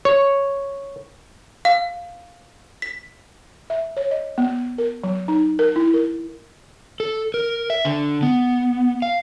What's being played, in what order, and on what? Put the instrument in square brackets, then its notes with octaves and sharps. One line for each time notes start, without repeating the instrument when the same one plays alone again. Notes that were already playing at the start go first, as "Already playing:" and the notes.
[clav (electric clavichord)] C#5
[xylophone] F5
B6
[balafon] E5
C#5
D#5
B3
A#4
F#3
D#4
A#4
E4
A#4
[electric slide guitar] A4
A#4
E5
D3
B3
F5